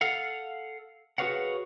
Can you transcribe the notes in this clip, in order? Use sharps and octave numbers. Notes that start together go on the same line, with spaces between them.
A4 F5 F#5
F#4 G#4 B4 C#5 F5 F#5